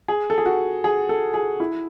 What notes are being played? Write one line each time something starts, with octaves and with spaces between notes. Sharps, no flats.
G#4
A4
G#4
F#4
G#4
A4
G#4
E4